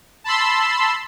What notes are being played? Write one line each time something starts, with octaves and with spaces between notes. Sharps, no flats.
A5 B5 C6 E6